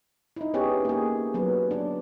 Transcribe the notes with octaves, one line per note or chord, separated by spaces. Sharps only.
D#4 E4
B3 C#4 G4 G#4 C#5
A#3 G#4
F#3 B3
D4